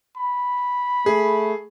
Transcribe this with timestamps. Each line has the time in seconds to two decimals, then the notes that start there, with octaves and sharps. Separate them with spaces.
0.18 B5
1.06 A3 G#4